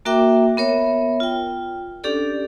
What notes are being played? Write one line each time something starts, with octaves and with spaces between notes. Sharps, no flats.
A#3 F#4 A#4 E5 G5 D6
B3 A#4 C#5 E5
F4 G5
C#4 D4 G4 A4 D5